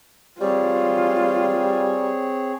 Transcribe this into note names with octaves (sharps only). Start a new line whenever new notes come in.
G3 C4 F4 G#4 C#5